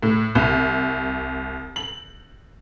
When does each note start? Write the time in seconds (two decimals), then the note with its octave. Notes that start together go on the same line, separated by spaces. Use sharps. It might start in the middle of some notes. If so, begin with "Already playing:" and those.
0.03 A2
0.35 C2
1.76 F#7